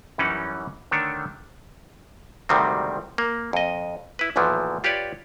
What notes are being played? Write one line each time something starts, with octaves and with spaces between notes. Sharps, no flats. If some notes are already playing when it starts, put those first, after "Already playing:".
F#2 E3 G3 C#4 D#4 F#5
D3 D#3 A3 D4 C#5
D2 G#2 C3 D#3 G3 C4
A#3
F2 D#5
E4 B4
B1 E2 A#2 E3 F3
F4 G4 B4 C#5 D5